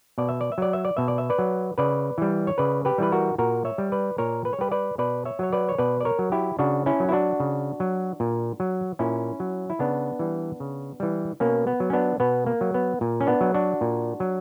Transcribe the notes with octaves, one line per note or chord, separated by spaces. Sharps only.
B2 D5
E5
D5
E5
F#3 D5
E5
D5
B2 E5
D5
E5
B4 D5
F#3
C#3 B4 D5
E3 G3
C#5
C#3 B4 D5
G4 B4
E3 G3 B4
F#4 A#4
A#2 F#4 A#4
C#5 E5
G3
B4 D5
A#2 A#4 C#5
B4
C#5
G3 G4 B4
B4 D5
B2 B4 D5
C#5 E5
F#3 C#5
B4 D5
C#5
B2 B4 D5
D5
A#4 C#5
F#3
E4 G4
C#3 D4 F#4
C#4 E4
F#3
E4
D4 F#4
C#3
F#3
A#2
F#3
A#2 C#4 E4
F#3
E4
C#3 B3 D4
E3 G3
C#3
E3 G3
B2 A#3 C#4
B3
F#3
C#4
B3 D4
B2 B3
A#3
F#3
B3
A#2
C#4
B3 D4
F#3
D4 F#4
A#2
F#3